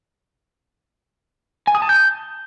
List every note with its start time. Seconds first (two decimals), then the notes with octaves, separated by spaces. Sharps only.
1.67 G#5
1.75 D#6
1.82 A5
1.89 G6